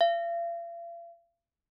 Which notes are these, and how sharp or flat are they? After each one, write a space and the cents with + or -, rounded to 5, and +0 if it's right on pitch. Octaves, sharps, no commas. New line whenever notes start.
F5 -45